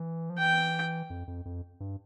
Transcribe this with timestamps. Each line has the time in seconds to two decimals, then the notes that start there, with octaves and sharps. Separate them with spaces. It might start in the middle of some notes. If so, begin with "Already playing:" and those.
Already playing: E3
0.30 F3
0.38 E3 G5
1.10 F2
1.27 F2
1.45 F2
1.80 G2